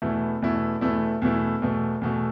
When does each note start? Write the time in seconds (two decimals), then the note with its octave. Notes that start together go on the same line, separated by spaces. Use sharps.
0.02 E2 B2 A3 E4
0.42 E2 B2 A3 E4
0.81 E2 B2 A3 E4
1.22 E2 B2 A3 E4
1.62 E2 B2 A3
2.01 E2 B2 A3